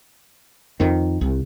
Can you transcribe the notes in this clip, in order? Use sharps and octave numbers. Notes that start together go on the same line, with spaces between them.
F2 D#3
C2